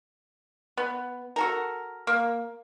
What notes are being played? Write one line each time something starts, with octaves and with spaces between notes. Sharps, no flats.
B3
F#4 A4 A#4
A#3